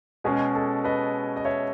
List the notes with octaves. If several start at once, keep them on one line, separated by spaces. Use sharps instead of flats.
B2 G#3 C#4 G#4
A4
B4 D#5
D#5
C#5 E5